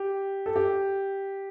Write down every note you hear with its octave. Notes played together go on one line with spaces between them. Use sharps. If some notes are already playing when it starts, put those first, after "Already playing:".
Already playing: G4
A4
G4